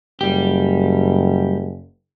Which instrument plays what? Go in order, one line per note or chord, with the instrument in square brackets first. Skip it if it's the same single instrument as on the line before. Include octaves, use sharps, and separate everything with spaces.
[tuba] F#1 [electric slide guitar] G3 G4